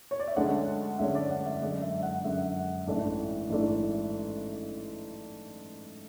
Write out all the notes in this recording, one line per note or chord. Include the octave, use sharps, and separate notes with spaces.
C#5
D5
E5
D2 D3 G#3 C#4 F#5
D2 D3 G#3 C#4 E5
D5
F#5
E5
F#2 D3 G#3 D5
E5
F#5
F#2 D3 G#3 E5
A1 G#2 E3 A3 D4
A1 G#2 E3 A3 D4